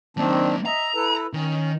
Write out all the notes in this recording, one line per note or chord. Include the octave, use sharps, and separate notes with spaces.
D#3 F#3 A#3 C4 D4
D#5 E5 A#5
E4 A4 B4
D#3 C#4